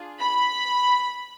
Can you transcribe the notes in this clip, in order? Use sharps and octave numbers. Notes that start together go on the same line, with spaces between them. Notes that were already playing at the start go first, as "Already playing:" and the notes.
Already playing: D4 F4 G#4
B5